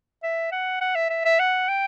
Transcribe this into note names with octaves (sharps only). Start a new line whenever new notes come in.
E5
F#5
F#5
E5
E5
E5
F#5
G5